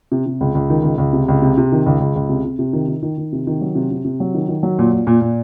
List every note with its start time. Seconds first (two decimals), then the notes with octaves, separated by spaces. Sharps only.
0.12 C3
0.26 C3
0.41 C#2
0.55 C#2
0.70 D#3
0.83 C#2
0.98 C#2
1.13 C3
1.28 C#2
1.42 C3
1.58 C3
1.72 D#3
1.86 C#2
2.00 C#2
2.16 C#2
2.29 C3
2.45 C3
2.59 C3
2.73 D#3
2.88 D#3
3.03 D#3
3.18 D#3
3.32 C3
3.47 D#3
3.61 F#3
3.75 C3
3.91 C3
4.05 C3
4.20 F#3
4.34 D#3
4.48 D#3
4.63 F#3
4.79 A#2
4.93 A#2
5.07 A#2
5.21 A#2